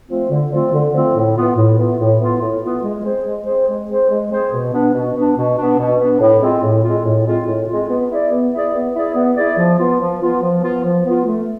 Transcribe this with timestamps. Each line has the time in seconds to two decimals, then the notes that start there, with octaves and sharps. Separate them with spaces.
0.09 F3 A3 C4 F4
0.30 D3
0.51 F3 A3 C4 F4
0.72 D3
0.93 F3 A3 C4 F4
1.14 A2
1.36 E3 B3 F4
1.56 A2
1.77 E3 B3 F4
1.98 A2
2.20 E3 B3 F4
2.40 A2
2.62 E3 B3 F4
2.83 G#3
3.04 C4 G#4 C5
3.25 G#3
3.46 C4 G#4 C5
3.67 G#3
3.88 C4 G#4 C5
4.09 G#3
4.30 C4 G#4 C5
4.51 B2
4.72 B3 D4
4.94 B2
5.15 B3 D4
5.36 B2
5.57 B3 D4
5.78 B2
5.99 B3 D4
6.20 A2
6.41 G#3 C4 F4
6.62 A2
6.83 G#3 C4 F4
7.04 A2
7.25 G#3 C4 F4
7.46 A2
7.68 G#3 C4 F4
7.89 B3
8.09 E4 G#4 D5
8.31 B3
8.52 E4 G#4 D5
8.73 B3
8.94 E4 G#4 D5
9.14 B3
9.36 E4 G#4 D5
9.57 F3
9.78 B3 F4
9.99 F3
10.20 B3 F4
10.41 F3
10.63 B3 F4
10.83 F3
11.04 B3 F4
11.25 A3